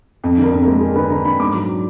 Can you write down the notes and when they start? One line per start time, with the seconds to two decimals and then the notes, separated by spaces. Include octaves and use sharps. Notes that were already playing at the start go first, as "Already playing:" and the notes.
0.24 F2
0.38 D3 A#4
0.52 F2
0.62 G#3 A#4
0.81 D3 G#4
0.95 D3 B4
1.10 D3 A#5
1.25 D3 B5
1.40 G#2 D6
1.53 F#3 A#5